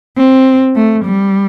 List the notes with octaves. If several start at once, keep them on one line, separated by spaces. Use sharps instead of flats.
C4
A3
G3